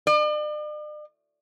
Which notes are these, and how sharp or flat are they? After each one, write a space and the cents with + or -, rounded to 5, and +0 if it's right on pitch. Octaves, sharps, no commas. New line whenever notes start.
D5 +45